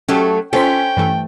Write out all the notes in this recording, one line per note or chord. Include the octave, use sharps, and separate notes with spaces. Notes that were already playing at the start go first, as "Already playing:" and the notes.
F#3 A3 C#4 G4
C#4 F4 A4 C5 G5 B6
G2 E3 A3